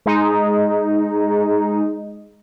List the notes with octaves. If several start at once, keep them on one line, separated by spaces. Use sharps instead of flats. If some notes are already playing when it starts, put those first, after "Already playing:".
G#3 D#4